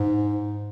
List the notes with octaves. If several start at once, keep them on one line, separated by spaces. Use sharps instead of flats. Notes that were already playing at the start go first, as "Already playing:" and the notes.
Already playing: G#2